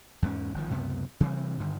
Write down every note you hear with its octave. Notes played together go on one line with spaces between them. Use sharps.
E2 G#2 C4 C#4
G1 D#3 F3
C#2 F#2 C3 B3
C3 E3 G3 C4
G2 D3 D#3